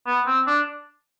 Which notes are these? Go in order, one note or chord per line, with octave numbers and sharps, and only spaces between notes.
B3
C4
D4